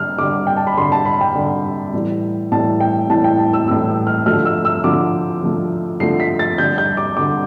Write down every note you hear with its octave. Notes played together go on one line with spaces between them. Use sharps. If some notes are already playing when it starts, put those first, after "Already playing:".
Already playing: D3 G3 F6
D3 G3 D6
G5
A5
B5
D3 G3 C6
A5
B5
G5
D3 G3
A2 E3 G3
A2 E3 G3 A5
G5
A2 E3 G3 A5
G5
A5
E6
A2 E3 G3 E6
F6
D3 F3 A3 F6
E6
E6
D3 F3 A3 D6
D3 F3 A3
D3 F3 A3 C7
B6
A6
D3 G3 G6
G6
D6
D3 G3 D6